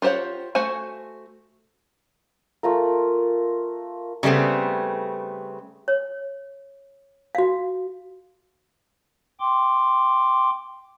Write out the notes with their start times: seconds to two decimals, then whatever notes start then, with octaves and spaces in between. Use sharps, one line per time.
0.02 F4 G4 C5 C#5 F#5
0.55 A3 F#4 C5 F#5 G#5
2.63 A3 F4 A#4
4.23 C#3 G3 A3 B3 C4
5.88 C#5
7.35 F#4 F5
9.40 G5 C6 D6